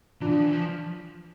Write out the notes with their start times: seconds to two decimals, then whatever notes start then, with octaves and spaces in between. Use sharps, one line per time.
0.21 E3 D4 F4
0.32 F3
0.42 E3
0.52 F3